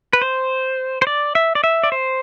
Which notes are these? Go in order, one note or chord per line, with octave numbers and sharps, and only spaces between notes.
B4
C5
C5
D5
E5
D5
E5
D5
C5